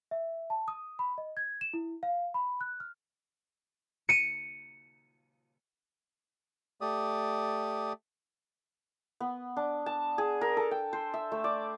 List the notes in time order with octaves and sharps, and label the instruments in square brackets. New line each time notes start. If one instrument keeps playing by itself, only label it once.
[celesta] E5
A5
D#6
B5
D#5
G#6
E7
E4
F5
B5
F#6
F6
[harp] C#7 D#7
[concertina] A3 G4 D5 D#6
[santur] B3
D4
A5
G#4
A#4
A4
G5
C5
E5
A3
D5